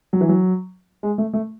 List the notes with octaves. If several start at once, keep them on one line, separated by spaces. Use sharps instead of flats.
F#3
E3
F#3
G#3
A3
A3